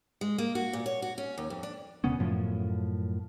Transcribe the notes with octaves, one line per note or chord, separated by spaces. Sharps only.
G#3
A#3
F#4
A#2
C#5
F#4
C#4
D#2
F2
D4
E1 C#3 B3 C#4
F#2 A2 F3